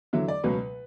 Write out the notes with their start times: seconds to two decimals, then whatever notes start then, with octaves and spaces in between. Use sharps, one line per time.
0.13 E2 D3 F#3 E5
0.28 D5
0.44 C#2 B2 F#3 B4